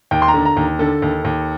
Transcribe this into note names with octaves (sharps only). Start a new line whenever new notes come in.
D#2 G5
C6
A#5
D3
A#5
D#2
D3 A4
D#2
D#2